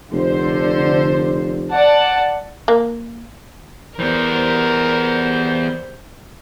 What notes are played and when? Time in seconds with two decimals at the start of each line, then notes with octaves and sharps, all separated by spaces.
0.12 F1 D3 C5
1.71 D5 F#5 A5
2.68 A#3
3.99 E3 G3 B3 A#4 C5